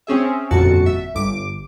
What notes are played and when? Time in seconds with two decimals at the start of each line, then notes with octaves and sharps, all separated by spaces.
0.07 C4 C#4 G#4 E5
0.51 G1 F2 A#2 F#4 A5 C#7
0.86 E5
1.15 G1 D6